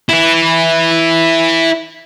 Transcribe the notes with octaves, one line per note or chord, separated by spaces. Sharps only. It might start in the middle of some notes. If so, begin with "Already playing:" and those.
E4 B4